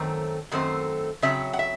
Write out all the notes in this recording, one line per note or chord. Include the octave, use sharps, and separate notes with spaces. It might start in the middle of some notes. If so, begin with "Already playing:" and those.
Already playing: F#2 D#3 A3 C4
F#2 D#3 A3 C4
C#3 F#3 C4 E5
F#5
E5